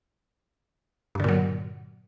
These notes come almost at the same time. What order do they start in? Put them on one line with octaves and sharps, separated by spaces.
G2 D3 A#2 F#3